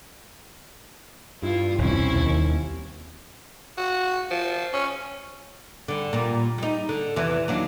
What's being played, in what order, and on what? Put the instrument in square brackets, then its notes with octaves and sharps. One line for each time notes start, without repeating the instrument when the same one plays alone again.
[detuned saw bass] G2 [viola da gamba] E4 F4
[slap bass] E1 C2 [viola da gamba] C4 C#4 E4
[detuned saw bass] D#2
[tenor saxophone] F#4
F3
C#4
[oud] D3 G3
A#2 G3
G3 D#4
D3
E2 C3 E3
D#2 F#3 D4